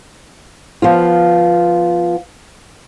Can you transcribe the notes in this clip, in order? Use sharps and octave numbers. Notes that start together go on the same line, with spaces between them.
F3 B3 F4